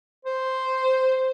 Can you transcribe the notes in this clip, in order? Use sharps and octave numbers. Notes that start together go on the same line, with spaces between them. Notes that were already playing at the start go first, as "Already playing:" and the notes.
C5